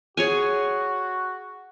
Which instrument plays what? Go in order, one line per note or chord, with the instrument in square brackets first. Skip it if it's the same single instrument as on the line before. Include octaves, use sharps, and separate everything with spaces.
[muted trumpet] F#4 [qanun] G#4 C#5 G#5